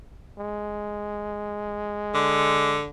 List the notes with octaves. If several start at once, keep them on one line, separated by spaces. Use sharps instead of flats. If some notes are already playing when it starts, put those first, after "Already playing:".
G#3
D3